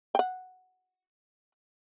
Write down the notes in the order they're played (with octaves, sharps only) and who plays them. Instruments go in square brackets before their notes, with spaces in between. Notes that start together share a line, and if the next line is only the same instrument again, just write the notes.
[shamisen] F#5 G5